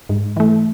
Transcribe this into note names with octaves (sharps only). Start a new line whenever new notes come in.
G#2
E3 A3